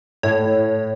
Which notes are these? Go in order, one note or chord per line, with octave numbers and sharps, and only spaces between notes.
A2 C#5